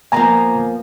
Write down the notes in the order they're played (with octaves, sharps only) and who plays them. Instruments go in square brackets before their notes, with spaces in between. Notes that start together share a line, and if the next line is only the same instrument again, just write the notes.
[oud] F3 A#3 B3 [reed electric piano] G#5 A#5